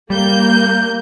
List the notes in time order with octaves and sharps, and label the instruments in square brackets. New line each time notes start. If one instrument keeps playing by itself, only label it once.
[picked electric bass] G3 [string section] A#3 G6